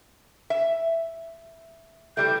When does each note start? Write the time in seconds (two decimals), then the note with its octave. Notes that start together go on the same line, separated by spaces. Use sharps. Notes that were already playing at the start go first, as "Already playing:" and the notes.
0.50 E5
2.17 E3 G3 A3 G6